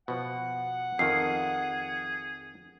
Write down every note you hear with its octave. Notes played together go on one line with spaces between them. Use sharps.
B2 F3 F#5
F2 D#3 G#4 C7